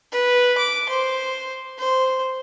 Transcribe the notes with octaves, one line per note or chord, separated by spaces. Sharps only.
B4
D6
C5
C5